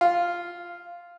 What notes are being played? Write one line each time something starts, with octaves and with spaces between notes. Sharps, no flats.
F4